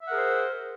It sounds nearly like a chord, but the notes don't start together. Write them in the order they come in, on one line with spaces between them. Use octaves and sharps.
E5 F#5 A#4 G#4 C5